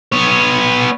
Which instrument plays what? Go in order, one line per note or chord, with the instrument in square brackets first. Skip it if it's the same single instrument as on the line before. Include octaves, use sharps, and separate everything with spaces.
[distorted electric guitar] B3 C#5